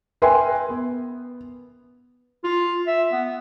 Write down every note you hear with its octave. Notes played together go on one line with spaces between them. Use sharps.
A#4 B4 E5 G5 G#5 C6
B3
F4
E5
B3